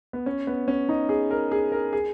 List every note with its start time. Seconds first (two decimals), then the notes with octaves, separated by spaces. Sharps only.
0.13 B3
0.26 C#4
0.47 B3
0.68 C#4
0.89 D#4
1.09 G#4
1.31 A#4
1.52 G#4
1.72 A#4
1.93 G#4